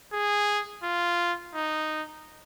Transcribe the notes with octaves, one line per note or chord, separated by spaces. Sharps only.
G#4
F4
D#4